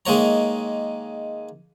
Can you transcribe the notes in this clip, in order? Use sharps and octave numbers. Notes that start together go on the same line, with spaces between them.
D#3 G#3 A#3 C#5 A#5